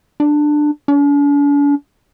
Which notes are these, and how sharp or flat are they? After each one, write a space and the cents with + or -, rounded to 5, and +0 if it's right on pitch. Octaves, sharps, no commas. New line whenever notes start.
D4 +15
D4 -45